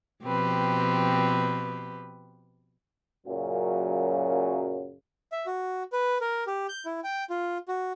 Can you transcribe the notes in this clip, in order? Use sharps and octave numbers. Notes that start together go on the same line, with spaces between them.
B2 F3 C4 G4 B4
F#2 A#2 C#3 F#3
E5
F#4
B4
A#4
G4
G6
E4
G5
F4
F#4